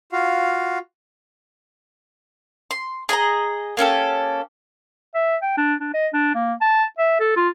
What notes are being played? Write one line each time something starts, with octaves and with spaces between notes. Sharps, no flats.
F4 F#4 F5
C6
G#4 D#5 A5 A#5
A#3 C#4 G4 A4
E5
G5
D4
D4
D#5
D4
A#3
A5
E5
A4
F4